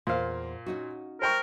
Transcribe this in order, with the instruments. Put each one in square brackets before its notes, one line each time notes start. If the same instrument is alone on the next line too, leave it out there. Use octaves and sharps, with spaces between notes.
[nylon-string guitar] E2 C5 [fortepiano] A#2 F5
[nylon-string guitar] C#4 D#4 F#4
[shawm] A#4 [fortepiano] C5 G5 C#6